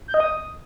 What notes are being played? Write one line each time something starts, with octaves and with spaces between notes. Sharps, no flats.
G6
D#5
D#6